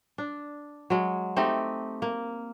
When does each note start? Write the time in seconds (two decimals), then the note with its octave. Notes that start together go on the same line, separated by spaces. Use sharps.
0.18 D4
0.90 F#3 G#3
1.37 A3 C4 D#4 G4
2.02 A#3